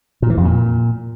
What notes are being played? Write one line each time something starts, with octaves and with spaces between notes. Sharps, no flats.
A#2
E3
F2
A#2